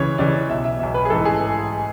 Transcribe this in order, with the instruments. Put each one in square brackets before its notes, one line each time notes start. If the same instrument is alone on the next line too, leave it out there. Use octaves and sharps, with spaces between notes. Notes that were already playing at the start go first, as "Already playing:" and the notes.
Already playing: [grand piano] C#2 C#3 E3 C#5
C#2 C#3 E3 D5
B1 B2 E5
E5
B1 B2 E5
B4
G#4
A1 G#2 E3 A4
G#4